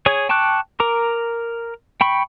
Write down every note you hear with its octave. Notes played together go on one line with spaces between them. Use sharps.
G#4 C#5 D#6
G5 A5 C#6 D6 F#6
A#4 A#5 D6
G5 B5 C#6